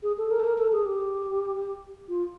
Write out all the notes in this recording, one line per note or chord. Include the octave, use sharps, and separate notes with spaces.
G#4
A4
A#4
A4
A#4
A4
G#4
G4
F4